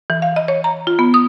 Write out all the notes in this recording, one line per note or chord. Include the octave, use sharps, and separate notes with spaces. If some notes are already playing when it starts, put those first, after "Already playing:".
E3
F5
D#5
C#5
A#5
F4
B3
D#6